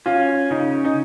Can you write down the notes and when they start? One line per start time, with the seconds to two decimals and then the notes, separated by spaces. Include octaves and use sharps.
0.06 C#4 F4
0.51 C#3 D#4
0.85 D#4